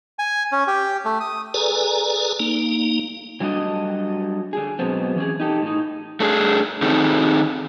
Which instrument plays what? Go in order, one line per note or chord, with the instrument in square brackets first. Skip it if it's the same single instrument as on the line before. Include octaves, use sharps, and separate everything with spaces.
[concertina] G#5
C#4
G4
A3
D#6
[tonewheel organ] G#4 A4 B4 D5 G#5 A#5
A#3 D#4
[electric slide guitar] F#3 G3 A3 D4 F#4 D#5
D3 G#4
B2 F#3 G#3 A3 B3 C4
E3 C#4 G#4
D#4 G4 A4
A2 D#4
A3 D4 G#4
D#3 C4 D#4 G#4 A4